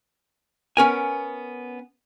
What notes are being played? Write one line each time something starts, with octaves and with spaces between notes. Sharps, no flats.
B3 C#4 A#4 G#5